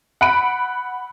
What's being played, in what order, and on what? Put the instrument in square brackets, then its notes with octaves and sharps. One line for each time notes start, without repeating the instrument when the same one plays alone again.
[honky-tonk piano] F#5 B5 D7